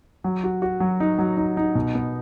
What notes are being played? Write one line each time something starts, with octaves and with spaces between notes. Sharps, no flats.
F#3
F#4
F#4
F#3
D#4
F#3
D#4
D#4
B2
B3